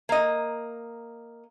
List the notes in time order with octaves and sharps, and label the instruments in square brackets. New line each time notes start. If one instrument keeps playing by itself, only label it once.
[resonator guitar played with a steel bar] A#3 D#5